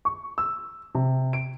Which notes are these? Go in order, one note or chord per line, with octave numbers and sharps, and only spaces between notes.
C#6
E6
C3
D7